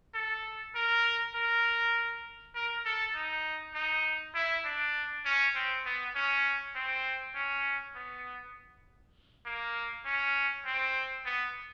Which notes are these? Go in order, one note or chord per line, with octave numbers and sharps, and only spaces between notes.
A4
A#4
A#4
A#4
A4
D#4
D#4
E4
D4
C#4
C4
B3
C#4
C4
C#4
B3
A#3
C#4
C4
B3